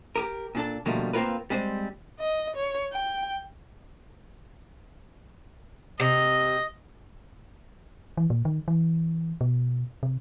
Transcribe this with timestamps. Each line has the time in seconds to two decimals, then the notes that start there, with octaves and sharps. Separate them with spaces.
0.16 G4 G#4 A#4
0.55 A#2 D4 A4
0.86 B2 D3 F3 G3 A3 A#3
1.13 A#3 C4 D4 F4 A#4 B4
1.50 G3 G#3 C4 C5
2.20 D#5
2.56 C#5
2.92 G5
6.00 C3 D#5
8.17 E3
8.30 A#2
8.45 D#3
8.68 E3
9.41 B2
10.03 C3